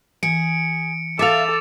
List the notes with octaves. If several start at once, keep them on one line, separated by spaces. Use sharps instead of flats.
E3 G#4 C#7 D7
A4 E5 F5 D6 A6 F7